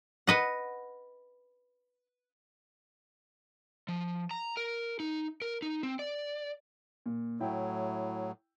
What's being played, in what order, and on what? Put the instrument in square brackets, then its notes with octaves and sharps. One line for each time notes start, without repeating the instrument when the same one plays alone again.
[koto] B4 D#5 F#5
[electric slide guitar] F3
A#5
A#4
D#4
A#4
D#4
C4
D5
[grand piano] A#2
[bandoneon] A2 F#3 [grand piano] E4 G5